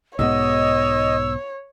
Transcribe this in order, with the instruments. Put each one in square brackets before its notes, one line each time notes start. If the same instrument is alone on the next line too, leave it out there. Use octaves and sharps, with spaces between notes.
[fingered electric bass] B1 G#2 B3 [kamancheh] C#5 [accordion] D#5 [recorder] E6